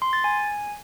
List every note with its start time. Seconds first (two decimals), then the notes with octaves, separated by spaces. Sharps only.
0.02 C6
0.13 A6
0.24 G#5